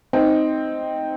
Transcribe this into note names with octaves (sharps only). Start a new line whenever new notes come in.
C4 D#4